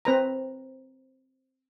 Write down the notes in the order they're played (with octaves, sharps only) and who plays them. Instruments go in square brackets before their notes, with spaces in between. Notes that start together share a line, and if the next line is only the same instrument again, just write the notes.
[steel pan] C4 B4 A#5